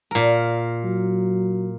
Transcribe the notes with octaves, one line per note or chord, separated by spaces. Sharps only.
A#2 A#4
F#3